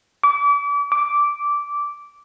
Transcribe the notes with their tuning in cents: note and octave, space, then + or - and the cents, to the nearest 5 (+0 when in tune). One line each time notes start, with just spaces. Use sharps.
D6 -35
D6 -10